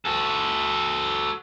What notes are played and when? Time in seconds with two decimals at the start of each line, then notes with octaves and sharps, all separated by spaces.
0.05 F#4 A4